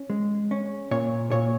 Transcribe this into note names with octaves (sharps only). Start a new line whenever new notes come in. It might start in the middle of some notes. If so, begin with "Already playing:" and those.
Already playing: C#4
G#3
C#4
A#2 C#5
A#2 C#5